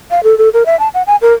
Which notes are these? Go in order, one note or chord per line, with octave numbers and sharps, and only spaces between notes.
F5
A4
A4
A#4
E5
A5
F#5
G#5
A#4